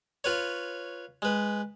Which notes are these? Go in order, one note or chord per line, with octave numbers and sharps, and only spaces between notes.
F4 B4 C#5
G#3 B4